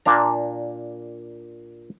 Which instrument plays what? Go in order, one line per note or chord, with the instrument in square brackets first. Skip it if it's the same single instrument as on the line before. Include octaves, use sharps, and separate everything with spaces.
[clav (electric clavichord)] A#2 A#3 D4 A#5